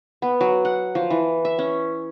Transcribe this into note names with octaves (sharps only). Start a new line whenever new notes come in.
B3
F#3
F#5
F3
E3
E5
C#4